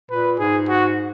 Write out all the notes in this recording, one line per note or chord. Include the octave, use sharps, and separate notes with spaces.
A#2 B4
G#2 G#4
F#4